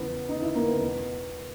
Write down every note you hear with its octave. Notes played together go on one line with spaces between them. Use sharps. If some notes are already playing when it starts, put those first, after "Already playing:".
Already playing: E2 C#3 E3 B3
D#4
E4
A#3
B3
E2 B2